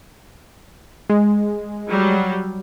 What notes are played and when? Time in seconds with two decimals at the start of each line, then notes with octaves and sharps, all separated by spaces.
1.09 G#3
1.89 F#3 G3